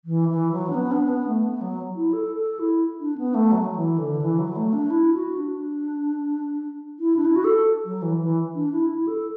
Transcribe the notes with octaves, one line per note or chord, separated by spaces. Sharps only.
E3
E3
F#3
D4
B3
D4
B3
A3
B3
F#3
E4
A4
A4
E4
D4
B3
A3
F#3
E3
D3
E3
F#3
A3
D4
E4
F#4
D4
E4
D4
E4
F#4
A4
F#3
E3
E3
D4
E4
E4
A4